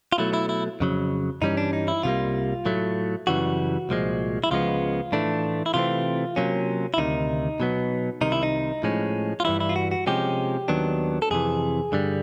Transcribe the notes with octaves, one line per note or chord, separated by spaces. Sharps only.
F4
B2 F#3 A3 E4
E4
E4
F2 C#3 F#3
G2 E3 G3 A#3 C#4 D#4
D4
D#4
E4
C2 C3 E3 G3 A#3 F4
A2 F#3 A3
F#2 C#3 E3 G3 F#4
C2 A#2 F3 G#3
E4
C#2 C#3 F3 G#3 B3 F4
A2 E3 A3 D4
E4
C3 E3 A3 C4 F4
C3 D#3 F#3 A#3 C#4
E4
D2 C3 D#3 D#4
B2 F#3 B3
C2 C3 D#3 D#4
E4
D#4
A2 F3 G#3 C#4
F4
G2 E3 G3 E4
E4
F4
F#4
F#4
C3 F3 G#3 C#4 G4
D#2 D#3 F#3 B3 D4
A4
F2 C3 E3 G#4
G2 D3 G3